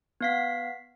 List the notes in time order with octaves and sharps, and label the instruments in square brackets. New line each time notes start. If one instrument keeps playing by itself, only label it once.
[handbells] B3 F5 B6